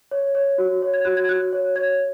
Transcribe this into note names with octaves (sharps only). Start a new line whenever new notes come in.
C#5
C#5
F#4
C#5
G#6
F#4 F#6
G#6
F#4 F#6
C#5
C#5 G#6